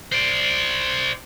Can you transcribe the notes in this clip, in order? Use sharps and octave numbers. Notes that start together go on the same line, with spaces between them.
C5 D5